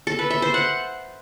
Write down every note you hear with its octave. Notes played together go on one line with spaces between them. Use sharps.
A4
B4
E5
C5
F#5